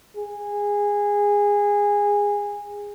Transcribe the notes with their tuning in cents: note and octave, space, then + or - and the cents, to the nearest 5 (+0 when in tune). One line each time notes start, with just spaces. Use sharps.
G#4 -20